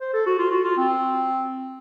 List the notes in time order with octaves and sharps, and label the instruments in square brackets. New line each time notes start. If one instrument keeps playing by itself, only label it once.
[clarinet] C5
A4
F#4
F4
F#4
F4
C4